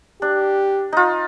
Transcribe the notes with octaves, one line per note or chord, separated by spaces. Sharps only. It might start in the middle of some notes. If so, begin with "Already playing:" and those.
D4 G4
D#4 F4